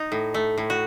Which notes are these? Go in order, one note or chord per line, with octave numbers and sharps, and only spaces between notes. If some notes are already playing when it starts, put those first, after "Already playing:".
Already playing: D#4
A2
A3
A2
F#4